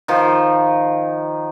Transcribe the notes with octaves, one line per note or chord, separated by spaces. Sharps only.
D#3 F3